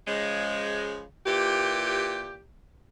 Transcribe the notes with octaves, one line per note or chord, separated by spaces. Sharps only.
C#3 F3 G#3
A#2 E3 G4